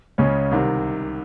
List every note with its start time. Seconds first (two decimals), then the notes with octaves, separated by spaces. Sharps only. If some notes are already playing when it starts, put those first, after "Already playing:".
0.18 C#2 C#3 C#4
0.51 C2 C3 D#3